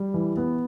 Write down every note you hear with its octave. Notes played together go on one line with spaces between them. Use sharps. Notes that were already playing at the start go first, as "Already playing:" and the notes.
Already playing: G3
E3
B3